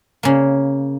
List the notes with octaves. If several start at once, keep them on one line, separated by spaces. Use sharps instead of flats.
C#3 A#3